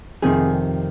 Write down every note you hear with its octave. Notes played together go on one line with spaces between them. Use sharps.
F2 C3 D#3 G#4